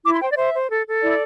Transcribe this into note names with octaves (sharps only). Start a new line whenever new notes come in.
E4 D6
C6
C5 G5
D5
C5 E5
C5
A4
A4
E4 D5